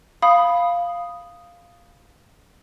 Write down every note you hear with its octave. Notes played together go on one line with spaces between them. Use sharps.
F5 B5 D#6